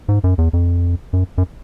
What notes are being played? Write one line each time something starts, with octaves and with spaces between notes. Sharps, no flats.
G#2
F#2
E2
F2
F#2
F#2